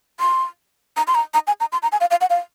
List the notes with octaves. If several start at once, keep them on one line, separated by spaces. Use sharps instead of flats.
C6
A#5
C6
A#5
A#5
G#5
A#5
C6
A#5
G#5
F5
F5
F#5
F5